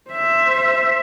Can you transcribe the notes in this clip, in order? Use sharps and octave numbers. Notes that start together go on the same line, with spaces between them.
C5 E5